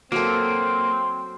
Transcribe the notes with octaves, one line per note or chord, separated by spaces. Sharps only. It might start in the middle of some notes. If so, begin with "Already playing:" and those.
F#3 A#3 C4 A4